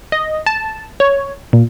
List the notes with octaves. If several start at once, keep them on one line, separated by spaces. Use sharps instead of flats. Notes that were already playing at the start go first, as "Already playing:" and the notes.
D#5
A5
C#5
A#2